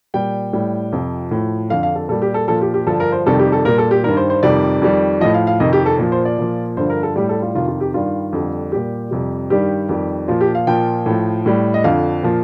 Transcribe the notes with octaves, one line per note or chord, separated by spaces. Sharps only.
A#2 G3 G5
A2 G3
F2 C3 F3
A2 F3
F2 D3 F3 F5
F5
A4
A#2 G3 A4
G4
A4
A#2 F3 A4
G4
G4
G2 D3 F3 A4
A#4
C5
F2 C3 D#3 G3 A4
G4
A4
A#2 G3 A#4
A4
G4
G2 D#3 G3 A#4
C5
C5
F2 C3 D#3 G3 D5
F2 D#3 G3
A2 F3 D#5
F5
F5
F2 C3 D#3 D#5
G4
A4
A#2 F3
C5
D5
A#2 F3
G2 D3 F3 C5
A#4
A4
A2 G3 G4
A4
F4
F2 C3 D#3 F4
F4
G4
G2 D#3 G3 F4
F2 D3 G3
A#2 G3 G4
F2 C3 G3
G2 D#3 G3 G4
F2 D#3 G3
A#2 F3 F4
G4
F5
A#2 F3 G5
A2 F3
A2 G3
D#5
F2 D3 F3 F5
A#2 F3